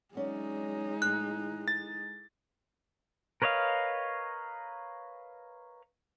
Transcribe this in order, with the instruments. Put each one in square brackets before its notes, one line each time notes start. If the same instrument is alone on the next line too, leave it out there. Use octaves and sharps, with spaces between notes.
[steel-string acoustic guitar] F#3 C#4 D5 [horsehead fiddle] G#3 D#4
[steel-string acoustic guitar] A2 [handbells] F#6
[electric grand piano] A6
[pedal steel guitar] A#4 B4 C#5 D#5 F5